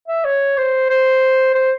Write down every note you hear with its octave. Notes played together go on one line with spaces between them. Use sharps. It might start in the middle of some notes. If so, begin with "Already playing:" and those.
E5
C#5
C5
C5
C5